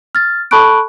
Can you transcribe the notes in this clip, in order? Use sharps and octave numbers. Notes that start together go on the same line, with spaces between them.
F6 A6
A4 A5 B5 C#6 F#6 D7